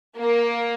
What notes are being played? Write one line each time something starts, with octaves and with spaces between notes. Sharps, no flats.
A#3